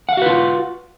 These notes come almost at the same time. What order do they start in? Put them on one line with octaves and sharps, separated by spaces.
F#5 F5 F#4 B4 F4